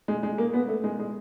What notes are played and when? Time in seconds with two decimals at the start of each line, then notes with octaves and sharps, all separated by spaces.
0.08 G#3
0.23 G#3
0.38 A#3
0.54 B3
0.69 A3
0.84 G#3
0.99 G#3